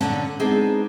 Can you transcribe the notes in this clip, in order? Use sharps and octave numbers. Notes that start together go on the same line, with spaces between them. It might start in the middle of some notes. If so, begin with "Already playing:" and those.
A#2 D3 C#4 D5 F#5 A5
G#3 B3 C4 D4 D#4 G#4